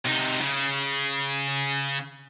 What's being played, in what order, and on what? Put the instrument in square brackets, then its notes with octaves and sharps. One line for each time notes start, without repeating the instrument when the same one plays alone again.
[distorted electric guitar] C3 D#4
C#3